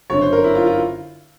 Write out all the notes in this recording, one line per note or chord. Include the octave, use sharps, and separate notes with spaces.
G1 F#2 D3 C#5
C5
A#4
E4
F4
F4